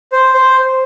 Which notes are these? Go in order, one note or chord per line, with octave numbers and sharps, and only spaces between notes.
C5
C5